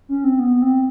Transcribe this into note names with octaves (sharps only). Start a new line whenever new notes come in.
C#4
C4
B3
C4